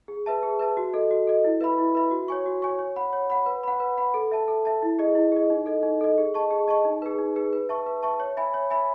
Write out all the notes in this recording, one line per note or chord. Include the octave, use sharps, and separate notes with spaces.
G#4
B4 E5 A5
G#4
B4 E5 A5
F#4
A4 D#5
F#4
A4 D#5
E4
B4 E5 B5
E4
B4 E5 B5
F#4
C#5 G#5 C#6
F#4
C#5 G#5 C#6
C#5
F#5 B5
C#5
F#5 B5
B4
F#5 B5
B4
F#5 B5
A4
E5 A5
A4
E5 A5
E4
G#4 D#5
E4
G#4 D#5
D#4
A4 D#5
D#4
A4 D#5
G#4
D#5 A5 C#6
G#4
D#5 A5 C#6
D#4
G#4 B4
D#4
G#4 B4
B4
E5 A5 C#6
B4
E5 A5 C#6
C#5
E5 G#5 B5
C#5
E5 G#5 B5